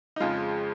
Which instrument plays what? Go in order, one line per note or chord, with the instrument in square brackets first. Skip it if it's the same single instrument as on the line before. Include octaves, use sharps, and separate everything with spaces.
[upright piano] D#4
F2 C#3 F3 G#3 F4